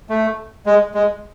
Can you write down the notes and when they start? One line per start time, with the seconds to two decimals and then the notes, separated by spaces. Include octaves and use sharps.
0.09 A3
0.66 G#3
0.94 G#3